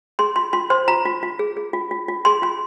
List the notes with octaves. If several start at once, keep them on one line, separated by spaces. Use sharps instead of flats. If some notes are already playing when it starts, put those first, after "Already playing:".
G#4 C6
F4 C6
F4 C6
C5 C6
F4 A#5
F4
F4
G#4
G#4
F4
F4
F4
G#4 C6
F4 C6